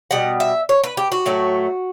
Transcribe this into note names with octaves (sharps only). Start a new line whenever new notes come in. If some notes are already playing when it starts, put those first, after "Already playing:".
B2 G3 F#5
E5
C#5
B4
G4
F#4
A2 F#3 A3